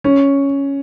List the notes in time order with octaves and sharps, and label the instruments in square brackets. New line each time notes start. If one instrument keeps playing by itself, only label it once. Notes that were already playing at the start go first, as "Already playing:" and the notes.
[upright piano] C#4